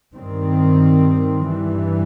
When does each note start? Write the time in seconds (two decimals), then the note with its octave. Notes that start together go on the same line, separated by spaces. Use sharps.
0.14 G2 D#3 G3 C4
1.49 G2 E3 G3